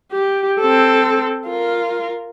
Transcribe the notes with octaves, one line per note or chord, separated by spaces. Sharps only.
G4
C4 A4
F4 A#4